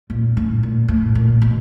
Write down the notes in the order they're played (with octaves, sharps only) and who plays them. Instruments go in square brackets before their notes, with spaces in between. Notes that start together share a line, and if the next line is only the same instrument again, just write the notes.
[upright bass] A#2
A2
A#2
A2
A#2
B2